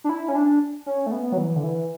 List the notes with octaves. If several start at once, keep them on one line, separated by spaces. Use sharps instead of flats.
D4
E4
C#4
D4
C#4
A3
B3
F#3
E3
D3
E3